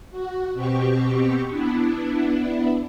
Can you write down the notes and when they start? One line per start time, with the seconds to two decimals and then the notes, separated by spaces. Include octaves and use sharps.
0.11 F#4
0.53 B2 C4 G4 C#6
1.47 B3 D4 E4